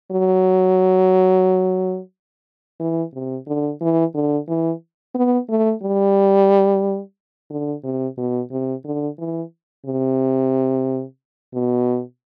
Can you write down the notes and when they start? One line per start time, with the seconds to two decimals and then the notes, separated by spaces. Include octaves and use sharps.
0.11 F#3
2.80 E3
3.14 C3
3.47 D3
3.81 E3
4.14 D3
4.48 E3
5.15 B3
5.49 A3
5.83 G3
7.50 D3
7.84 C3
8.18 B2
8.51 C3
8.85 D3
9.18 E3
9.86 C3
11.54 B2